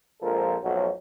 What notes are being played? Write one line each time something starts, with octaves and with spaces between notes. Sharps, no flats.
A#1 F3 G#3 A4 A#4
B1 F2 A2 F#3